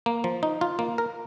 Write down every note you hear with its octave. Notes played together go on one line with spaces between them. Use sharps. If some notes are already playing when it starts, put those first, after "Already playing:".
A#3
F3
D#4
F4
A#3
A#4